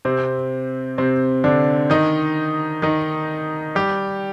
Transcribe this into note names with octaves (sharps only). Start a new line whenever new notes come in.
C3 C4
C3 C4
D3 D4
D#3 D#4
D#3 D#4
G3 G4